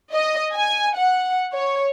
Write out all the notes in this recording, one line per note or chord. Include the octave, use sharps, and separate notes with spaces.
D#5
G#5
F#5
C#5